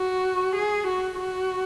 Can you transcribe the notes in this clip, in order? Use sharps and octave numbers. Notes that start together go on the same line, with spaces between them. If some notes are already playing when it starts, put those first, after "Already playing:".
Already playing: F#4
G#4
F#4
F#4